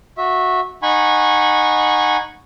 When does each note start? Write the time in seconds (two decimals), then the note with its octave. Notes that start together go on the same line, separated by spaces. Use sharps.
0.18 F#4 E5
0.83 D#4 F#5 G#5 B5 C#6